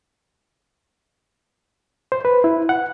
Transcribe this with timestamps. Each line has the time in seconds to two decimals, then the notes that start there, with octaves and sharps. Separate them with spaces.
2.12 C5
2.25 B4
2.44 E4
2.69 F#5